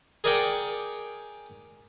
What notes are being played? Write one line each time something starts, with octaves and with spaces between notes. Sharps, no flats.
G#4 A#4 D5 F#5 G5